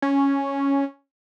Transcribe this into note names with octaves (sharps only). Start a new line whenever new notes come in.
C#4